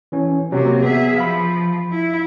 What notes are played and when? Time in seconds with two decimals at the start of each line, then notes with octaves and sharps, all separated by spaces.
0.12 E3 C#4
0.52 C3 F#3 A#3 C4 F#4
0.82 B3 G#4 E5
1.17 F3 F5 B5
1.92 E4